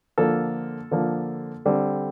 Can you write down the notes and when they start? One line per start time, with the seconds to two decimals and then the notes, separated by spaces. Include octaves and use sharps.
0.18 D3 F3 A#3 A4
0.91 D3 F3 A#3
1.66 D3 G3 C4